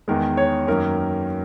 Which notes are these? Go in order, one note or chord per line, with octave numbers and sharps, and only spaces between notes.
E2 D#3 G#3 A#4
C#5
F#2 D#3 A#3 C#4 A#4